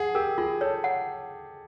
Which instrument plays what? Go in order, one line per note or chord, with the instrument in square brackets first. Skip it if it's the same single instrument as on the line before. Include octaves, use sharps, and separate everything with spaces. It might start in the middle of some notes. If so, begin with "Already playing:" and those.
Already playing: [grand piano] G#4 [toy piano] F#5
[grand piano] G4 [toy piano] A#4
[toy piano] F4 [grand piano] G#4
[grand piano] A4 [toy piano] C#5
[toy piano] F#5